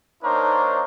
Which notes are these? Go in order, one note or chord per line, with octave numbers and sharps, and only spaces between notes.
A#3 D4 D#4 A#4 C5 C#5